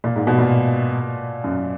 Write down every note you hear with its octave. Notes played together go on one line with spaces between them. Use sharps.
A#2
G#2
B2
A#2
F#2